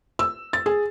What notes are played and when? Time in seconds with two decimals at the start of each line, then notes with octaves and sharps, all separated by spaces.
0.19 E6
0.53 A6
0.66 G#4